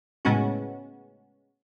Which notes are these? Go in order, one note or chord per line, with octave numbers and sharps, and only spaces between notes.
A2 C#3 G#3 B3 C#4 F#4